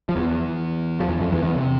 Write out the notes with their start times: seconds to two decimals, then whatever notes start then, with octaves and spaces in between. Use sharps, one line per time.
0.09 F3
0.16 E2 E3
1.00 F3
1.09 E2 E3
1.20 F2 F3
1.32 E2 E3
1.43 E2 E3
1.56 C3